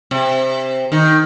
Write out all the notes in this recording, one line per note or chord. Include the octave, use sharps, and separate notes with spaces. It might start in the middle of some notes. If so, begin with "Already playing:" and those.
C3
D#3